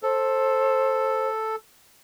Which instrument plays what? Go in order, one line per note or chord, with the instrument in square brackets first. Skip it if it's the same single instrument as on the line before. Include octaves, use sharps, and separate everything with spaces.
[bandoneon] A4 [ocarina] C5